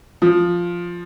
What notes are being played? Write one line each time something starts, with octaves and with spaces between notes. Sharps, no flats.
F3